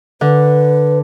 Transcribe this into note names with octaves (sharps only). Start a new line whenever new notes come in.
D3 B4